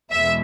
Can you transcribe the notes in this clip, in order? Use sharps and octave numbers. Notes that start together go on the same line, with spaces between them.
E2 B2 G#3 E5